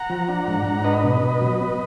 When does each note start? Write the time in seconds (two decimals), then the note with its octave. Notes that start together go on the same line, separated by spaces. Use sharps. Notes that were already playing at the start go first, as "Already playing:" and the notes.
Already playing: F#5 A#5
0.10 F3
0.29 D4
0.47 G#2
0.66 G#2
0.84 D4 B4 D#5
1.04 B2
1.22 B2
1.41 F#3
1.60 B3